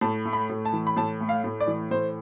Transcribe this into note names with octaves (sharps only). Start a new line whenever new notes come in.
A2 A5
A3
B5
A2
A5
E3
B5
A2 A5
A3
F5
A2
D5
E3
A2 C5